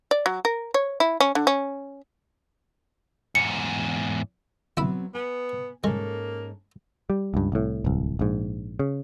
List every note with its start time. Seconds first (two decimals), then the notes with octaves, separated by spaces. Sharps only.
0.11 D5
0.26 F#3
0.45 A#4
0.74 C#5
1.00 E4
1.20 C#4
1.35 D3
1.47 C#4
3.35 E2 G#2 C#7
4.77 F#3 B3 C4 E4 B5
5.15 B3 G#5
5.84 G#2 G#3 A#3 C#4 A4
7.10 G3
7.34 C#2 G2
7.52 C2 A2
7.85 D1 C2
8.19 A#1 G#2
8.80 C#3